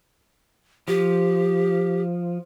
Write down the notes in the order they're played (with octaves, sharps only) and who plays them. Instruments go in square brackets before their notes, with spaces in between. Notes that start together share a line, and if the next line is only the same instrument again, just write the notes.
[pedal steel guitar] F3 [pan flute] G4